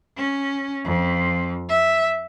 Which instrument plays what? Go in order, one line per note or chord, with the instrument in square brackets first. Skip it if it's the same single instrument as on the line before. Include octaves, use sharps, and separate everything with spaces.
[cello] C#4
F2
E5